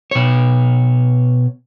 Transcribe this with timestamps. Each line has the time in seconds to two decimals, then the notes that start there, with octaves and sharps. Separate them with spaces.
0.11 B2 C#5